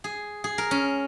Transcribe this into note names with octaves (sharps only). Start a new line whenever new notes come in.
G#4
G#4
A#4
C#4